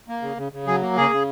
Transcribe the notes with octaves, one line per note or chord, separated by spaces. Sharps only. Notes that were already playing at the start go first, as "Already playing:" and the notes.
A#3
C#3
C#3
C#3
F#3 G#4
A#3
C#3 G#4
C#3